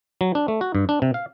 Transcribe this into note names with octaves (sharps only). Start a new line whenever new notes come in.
F#3
D4
A3
F#4
G2
D4
C3
F5